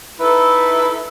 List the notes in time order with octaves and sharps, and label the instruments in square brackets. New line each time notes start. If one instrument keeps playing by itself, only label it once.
[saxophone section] D#4 E4 A4 B4